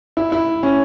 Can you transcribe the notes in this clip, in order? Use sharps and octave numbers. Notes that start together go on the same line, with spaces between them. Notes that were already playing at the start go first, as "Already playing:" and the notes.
E4
E4
C#4